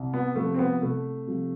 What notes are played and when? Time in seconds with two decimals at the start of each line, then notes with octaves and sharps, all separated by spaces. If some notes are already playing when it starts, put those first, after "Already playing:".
Already playing: C2
0.14 B3
0.36 C3 F3 A3
0.54 C4
0.59 B3
0.82 C2 A3
1.28 C3 F3